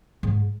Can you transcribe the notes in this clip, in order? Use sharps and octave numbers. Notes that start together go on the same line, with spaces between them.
G#2